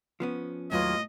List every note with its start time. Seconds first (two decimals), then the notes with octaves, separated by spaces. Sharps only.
0.20 F3 B3 C#4
0.72 D#2 A2 F#3 F4 B4 D#5